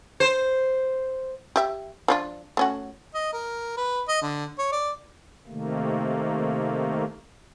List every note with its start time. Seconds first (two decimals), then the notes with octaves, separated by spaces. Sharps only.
0.20 C5
1.56 G4 E5
2.08 F3 D4 F4
2.57 A3 C#4 F#4
3.14 D#5
3.33 A#4
3.77 B4
4.08 D#5
4.22 D3
4.59 C#5
4.72 D5
5.47 C3 D#3 A3 A#3